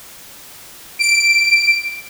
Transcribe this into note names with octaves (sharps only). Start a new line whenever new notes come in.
D7